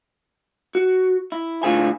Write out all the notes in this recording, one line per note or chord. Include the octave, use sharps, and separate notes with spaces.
F#4
E4
A2 D3 F4 G#4 C5 G#5